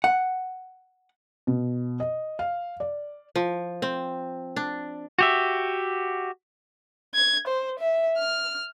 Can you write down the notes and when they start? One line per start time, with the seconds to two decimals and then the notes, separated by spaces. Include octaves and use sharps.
0.04 F#5
1.47 B2
2.00 D#5
2.39 F5
2.80 D5
3.36 F3
3.82 C4
4.56 D4
5.19 F#4 G4 E5
7.15 G#6
7.48 C5
7.80 E5
8.18 F6